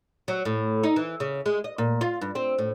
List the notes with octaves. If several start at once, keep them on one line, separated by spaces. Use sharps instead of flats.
F#3
A2
D#4
E3
C#3
G#3
D#5
A#2
F4
G2
C4
A2